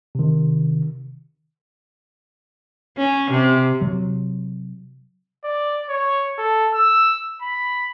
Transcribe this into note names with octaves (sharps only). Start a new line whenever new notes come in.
C3 D#3
C#4
C3
C3 F#3
D5
C#5
A4
E6
B5